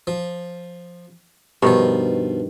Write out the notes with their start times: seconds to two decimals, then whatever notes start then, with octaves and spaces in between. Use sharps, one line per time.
0.07 F3
1.63 G2 B2 D#3 F3